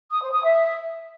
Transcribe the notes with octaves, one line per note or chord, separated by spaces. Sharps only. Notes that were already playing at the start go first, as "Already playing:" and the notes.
D#6
C5
D#6
E5